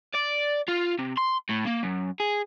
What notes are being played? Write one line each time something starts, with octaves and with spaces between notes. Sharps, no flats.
D5
F4
C3
C6
A2
A#3
F#2
G#4